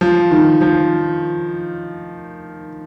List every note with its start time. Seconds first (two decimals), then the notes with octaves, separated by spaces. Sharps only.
0.01 F3
0.31 D#3
0.61 F3